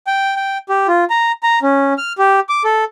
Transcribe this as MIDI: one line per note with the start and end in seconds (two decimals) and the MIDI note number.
0.07 0.35 79
0.36 0.58 79
0.69 0.87 67
0.88 1.04 65
1.10 1.32 82
1.43 1.59 82
1.63 1.93 61
1.98 2.13 89
2.18 2.40 67
2.49 2.63 86
2.64 2.84 69